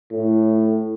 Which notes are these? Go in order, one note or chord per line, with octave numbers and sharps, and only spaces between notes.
A2